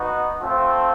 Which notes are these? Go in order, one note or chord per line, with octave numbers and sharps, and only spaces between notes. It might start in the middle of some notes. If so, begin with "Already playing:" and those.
Already playing: B3 D#4 F#4
A3 C4 F4